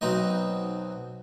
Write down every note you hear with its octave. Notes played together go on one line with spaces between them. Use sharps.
B1 F#3 B3 C4 D#4 D#5